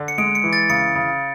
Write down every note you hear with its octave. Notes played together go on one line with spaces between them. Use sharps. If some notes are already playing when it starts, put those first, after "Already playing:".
Already playing: D3
C#7
G#3 D7
C#7
E3
A6
C#3 C#7
C#3